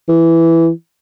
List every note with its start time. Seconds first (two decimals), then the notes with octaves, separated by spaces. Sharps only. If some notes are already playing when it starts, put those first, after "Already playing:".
0.08 E3